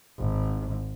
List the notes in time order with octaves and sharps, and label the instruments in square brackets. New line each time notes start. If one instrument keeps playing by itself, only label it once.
[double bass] G#1